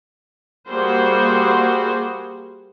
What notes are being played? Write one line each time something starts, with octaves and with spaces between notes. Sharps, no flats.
G3 A#3 F#4 G#4 C5